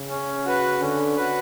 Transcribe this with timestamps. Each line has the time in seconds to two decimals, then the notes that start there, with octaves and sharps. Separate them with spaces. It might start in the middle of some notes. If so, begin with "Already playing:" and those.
Already playing: C#3
0.09 C#4
0.45 F#4 B4
0.81 D3 C#4
1.17 F#4 B4